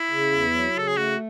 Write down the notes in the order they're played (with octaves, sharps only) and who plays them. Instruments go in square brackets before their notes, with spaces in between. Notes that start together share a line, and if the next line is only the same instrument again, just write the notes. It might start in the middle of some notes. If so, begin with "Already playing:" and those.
Already playing: [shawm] E4
[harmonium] C#3
E2
F#3
[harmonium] C#3 [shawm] A4
[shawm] G#4
[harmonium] A3 [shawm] F#4